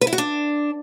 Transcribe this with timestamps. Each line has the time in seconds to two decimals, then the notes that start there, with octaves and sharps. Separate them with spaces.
0.01 B4
0.07 E4
0.13 F#4
0.18 D4